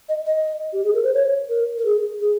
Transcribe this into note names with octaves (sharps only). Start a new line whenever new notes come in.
D#5
D#5
G4
G#4
A#4
C5
C#5
A#4
A#4
G#4
G#4